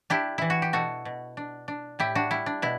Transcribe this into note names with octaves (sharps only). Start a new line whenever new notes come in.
D4 E4 G4
E3 E4
F#4
G4
B2 F#4 A4
B2
D4
D4
A2 E4 G4
D4 F#4
G3 E4
D4
B2 E4